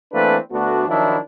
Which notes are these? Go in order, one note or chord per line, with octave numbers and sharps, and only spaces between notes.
E3 A3 A#3 C4 D4 B4
D2 A3 B3 D4 F#4
D#3 F3 F#3 D4 E4